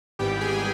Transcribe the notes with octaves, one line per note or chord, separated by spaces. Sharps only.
G#1 G#2 E3 G3 B3 G4 G5
G#4 G#5